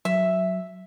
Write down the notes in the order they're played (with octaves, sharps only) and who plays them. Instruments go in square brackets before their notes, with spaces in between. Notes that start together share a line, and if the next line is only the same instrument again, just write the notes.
[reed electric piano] F#3 [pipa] E5